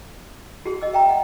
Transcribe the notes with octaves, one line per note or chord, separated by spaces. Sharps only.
F#4 G#4 C6
D#5 E6
E5 G5 A#5
F#5